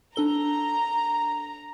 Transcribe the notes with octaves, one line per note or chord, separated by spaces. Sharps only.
D4 A4 A#5 G7